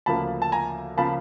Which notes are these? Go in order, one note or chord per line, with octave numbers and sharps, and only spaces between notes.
D2 C#3 F3 A#3 A5 B5
A5
G#5 A#5
C#3 F3 A#3 A5 B5